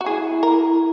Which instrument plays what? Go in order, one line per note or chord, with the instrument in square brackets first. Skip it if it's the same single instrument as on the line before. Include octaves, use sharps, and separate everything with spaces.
[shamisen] F#4
[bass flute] E4 [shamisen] G#4
[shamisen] A#4